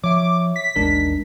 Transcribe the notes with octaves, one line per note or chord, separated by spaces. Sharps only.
F3 C#5 E5 D6
B6
A1 D#2 G#3 D4 A#4